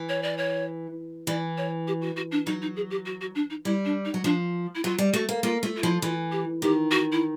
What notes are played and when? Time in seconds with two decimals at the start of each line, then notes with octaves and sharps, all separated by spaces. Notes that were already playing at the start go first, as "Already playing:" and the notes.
Already playing: E3
0.09 C#5
0.23 D5
0.37 C#5
1.27 E3 D5
1.57 C#5
1.87 G4
2.01 F#4
2.16 F#4
2.31 D4
2.46 F#3 D#4
2.62 D#4
2.76 G#4
2.90 G4
3.06 F#4
3.21 F#4
3.35 D4
3.50 D#4
3.65 G3 E4
3.85 D4
4.05 D#4
4.14 F#3
4.24 F3 D4
4.75 E4
4.83 F#3 F4
4.98 G3
5.13 A3 F#4
5.29 A#3
5.43 A#3 F4
5.63 A3 F4
5.76 F4
5.83 F3 E4
6.02 E3 F4
6.32 G4
6.62 D#3 G4
6.91 F#4
7.12 E4